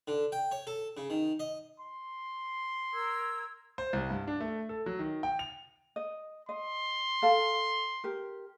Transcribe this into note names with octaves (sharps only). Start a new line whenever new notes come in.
D3
G5
C#5
A4
C#3
D#3
D#5
C6
A#4 E6 G#6
C5
C2
G2
D4
A3
A4
F#3
D#3
G5
F7
D#5
D#5 C6
A4 F5
G4 A#4